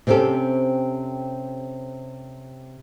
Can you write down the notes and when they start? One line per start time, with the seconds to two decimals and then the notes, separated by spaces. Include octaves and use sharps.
0.07 C3 C4 C#4 G4 A4